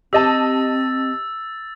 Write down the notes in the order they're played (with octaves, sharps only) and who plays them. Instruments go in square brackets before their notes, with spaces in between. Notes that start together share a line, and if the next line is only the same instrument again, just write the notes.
[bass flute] C4 [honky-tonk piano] G4 D#5 A5 [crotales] E6 A6